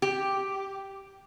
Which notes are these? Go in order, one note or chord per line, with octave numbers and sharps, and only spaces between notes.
G4